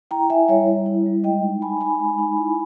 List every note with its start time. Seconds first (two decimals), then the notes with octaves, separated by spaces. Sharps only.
0.11 E4 G5 A#5
0.30 E4 E5 G#5
0.48 G3 C#5 E5
0.67 G3
0.86 E4
1.06 G3
1.24 G#3 D#5 G5
1.44 D#4
1.62 D#4 G#5 B5
1.81 D#4 G#5 B5
2.00 G#3
2.19 D#4
2.37 E4